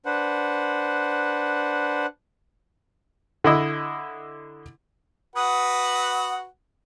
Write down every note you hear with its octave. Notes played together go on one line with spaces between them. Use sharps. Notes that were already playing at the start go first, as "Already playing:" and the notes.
D4 B4 C5 F#5
D3 E4 D#5 E6
F#4 B4 F#5 D#6